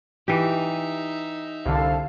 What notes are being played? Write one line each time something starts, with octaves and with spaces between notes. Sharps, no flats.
E3 D#4 G4 E5
C2 D3 A4 F5